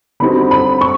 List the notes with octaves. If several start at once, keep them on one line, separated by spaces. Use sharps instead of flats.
D3 G3 C4 D#4 F#4 B5
B5
C#6